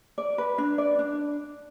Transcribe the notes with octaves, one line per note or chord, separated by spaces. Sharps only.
D5
B4
D4
D5
D4